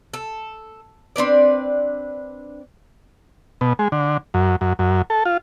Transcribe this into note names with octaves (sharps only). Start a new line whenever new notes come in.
A4
C4 D4 B4 D5
B2
G#3
D3
F#2
F#2
F#2
A4
F4